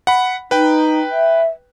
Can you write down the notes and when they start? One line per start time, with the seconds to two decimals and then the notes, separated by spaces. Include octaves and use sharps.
0.07 F#5 B5
0.51 D#4 B4 G5
1.11 E5